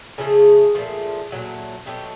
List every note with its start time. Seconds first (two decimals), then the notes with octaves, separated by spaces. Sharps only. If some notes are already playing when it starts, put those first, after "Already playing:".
0.18 C#3 F3 A3 G#4
0.75 A#2 F3 A3
1.31 A#2 F#3 A3
1.86 B2 F#3 A3 G4